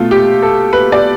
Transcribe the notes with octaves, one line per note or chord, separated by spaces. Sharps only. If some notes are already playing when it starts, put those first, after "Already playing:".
Already playing: B2 A3 F4
G4
A4
B4
D5